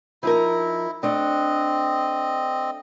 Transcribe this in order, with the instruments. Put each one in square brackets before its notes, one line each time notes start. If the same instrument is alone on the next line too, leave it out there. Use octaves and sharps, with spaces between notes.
[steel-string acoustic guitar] F3 D#4 A#4 [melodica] E4
[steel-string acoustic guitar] A3 D4 [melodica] C4 D#5